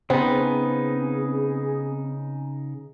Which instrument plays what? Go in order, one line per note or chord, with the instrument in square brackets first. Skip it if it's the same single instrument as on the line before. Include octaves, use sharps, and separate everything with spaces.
[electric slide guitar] C#3 D#4 [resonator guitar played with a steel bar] B3 [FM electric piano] C4 [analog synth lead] G#4